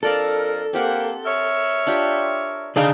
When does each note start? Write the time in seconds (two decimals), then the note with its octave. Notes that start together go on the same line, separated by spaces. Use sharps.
0.03 F2 D4 A4 A#4 D5 F5
0.73 A#3 C4 G4 F#5
1.24 A#4 C#5 E5
1.87 D4 F4 G4
2.76 D3 D4 D#4 G#4 D5 F5